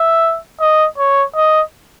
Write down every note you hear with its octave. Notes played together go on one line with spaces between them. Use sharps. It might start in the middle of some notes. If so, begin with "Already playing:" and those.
Already playing: E5
D#5
C#5
D#5